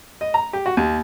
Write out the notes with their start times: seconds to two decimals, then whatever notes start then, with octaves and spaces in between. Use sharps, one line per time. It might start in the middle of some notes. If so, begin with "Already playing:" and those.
0.21 D#5
0.34 A#5
0.53 G4
0.66 F#4
0.77 D#2